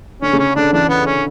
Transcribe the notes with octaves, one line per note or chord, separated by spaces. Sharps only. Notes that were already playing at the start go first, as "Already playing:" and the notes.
D3 C#4
C#3
C#4
D3 D4
E3 D4
B3
C#4